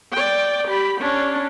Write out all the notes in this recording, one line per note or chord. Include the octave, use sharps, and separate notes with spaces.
D5 G5
G4 B5
C#4 D4